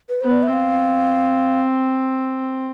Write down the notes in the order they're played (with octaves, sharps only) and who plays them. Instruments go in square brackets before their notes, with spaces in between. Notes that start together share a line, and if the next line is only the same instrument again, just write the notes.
[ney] B4
[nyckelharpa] B3 [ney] C5
[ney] D5
E5
[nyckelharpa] C4 [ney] F5